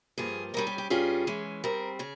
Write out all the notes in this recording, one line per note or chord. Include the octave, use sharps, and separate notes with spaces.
G2 F3 A#3 G#4
G#2 G3 C#4 A#4
G4
G4
G2 G3 C#4 F4 G#4
E3 G#3 C#4
G#2 G3 C4 A#4
C#3 G#4